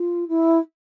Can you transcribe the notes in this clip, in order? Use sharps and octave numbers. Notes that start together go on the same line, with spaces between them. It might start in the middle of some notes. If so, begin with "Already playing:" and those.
Already playing: F4
E4